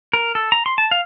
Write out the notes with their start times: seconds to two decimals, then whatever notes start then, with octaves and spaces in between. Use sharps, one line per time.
0.13 A#4
0.35 A4
0.52 A#5
0.66 C6
0.78 A5
0.91 F5